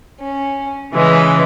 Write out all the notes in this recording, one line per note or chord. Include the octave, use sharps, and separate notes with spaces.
C#4
C#3 E3 G#3 B4